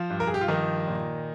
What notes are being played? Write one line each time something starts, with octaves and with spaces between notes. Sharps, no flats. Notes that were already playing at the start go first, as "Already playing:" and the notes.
Already playing: F3 F4
G2
A#4
G#4
G4
F4
D#3 F3 D#4
A#2